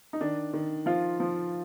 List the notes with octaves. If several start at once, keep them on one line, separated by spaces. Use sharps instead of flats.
D#4
D#3 D4
D#3
F3 F4
F3